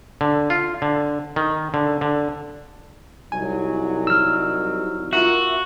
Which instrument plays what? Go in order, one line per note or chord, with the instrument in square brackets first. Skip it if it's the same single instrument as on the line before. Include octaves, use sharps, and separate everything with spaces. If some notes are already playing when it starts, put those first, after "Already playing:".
[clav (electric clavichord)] D3
F4
D3
D#3
D3
D3
[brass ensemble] C2 F#3 D#4 [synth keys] G#5
[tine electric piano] E6 F6
[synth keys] F4 A#4 E5 [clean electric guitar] F#4